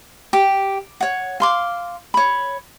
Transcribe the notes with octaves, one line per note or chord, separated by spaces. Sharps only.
G4
C#5 F#5
F5 C6 D6
C#5 B5